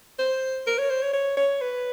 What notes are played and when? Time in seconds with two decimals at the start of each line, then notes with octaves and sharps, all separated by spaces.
0.19 C5
0.67 A#4
0.78 C#5
0.90 C5
1.02 C#5
1.13 C#5
1.37 C#5
1.61 B4